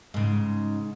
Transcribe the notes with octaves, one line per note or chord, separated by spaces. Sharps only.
G#2 C#3